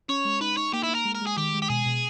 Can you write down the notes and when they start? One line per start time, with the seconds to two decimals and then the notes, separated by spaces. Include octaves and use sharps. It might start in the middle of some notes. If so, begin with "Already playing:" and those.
0.09 C#4 C#5
0.25 G#3
0.41 D#4 B4
0.57 D#4 C#5
0.73 A#3 G4
0.83 E4
0.89 A#3
0.95 A#4
1.05 G#3
1.15 A#4
1.21 G#3
1.27 G#4
1.37 D#3 G4
1.54 G#3
1.62 G4
1.70 B2 G#4
1.86 B2